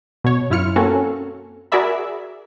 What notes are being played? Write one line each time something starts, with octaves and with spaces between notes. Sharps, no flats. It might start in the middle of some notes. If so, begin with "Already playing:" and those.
B2 C#5
F#2 E4 F4 F6 C#7
A#3 C4 C#4 F#4 A4 A#4
F#4 G#4 A#4 D5 E5 B5